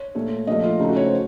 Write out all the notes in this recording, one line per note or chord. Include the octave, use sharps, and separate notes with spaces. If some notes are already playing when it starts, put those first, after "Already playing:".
Already playing: C#5
A#2 A3
A#2 F3 A3 D#5
F4
C#3 A3 D#4
F#4
C#5
C5